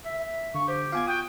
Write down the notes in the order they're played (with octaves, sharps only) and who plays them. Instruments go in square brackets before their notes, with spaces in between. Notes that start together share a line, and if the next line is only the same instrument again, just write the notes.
[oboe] E5
E5
[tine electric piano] D3 [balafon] F5 [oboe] C#6
[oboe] G4 [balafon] C5
[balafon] B3 F4 [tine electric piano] F5 G#5 G#6 [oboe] D6
[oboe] F#4 [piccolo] G5 [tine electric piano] D#6